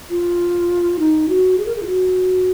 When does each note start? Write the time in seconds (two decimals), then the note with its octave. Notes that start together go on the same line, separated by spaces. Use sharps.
0.10 F4
0.99 D#4
1.29 F#4
1.58 G#4
1.66 A#4
1.76 G#4
1.83 F4
1.87 F#4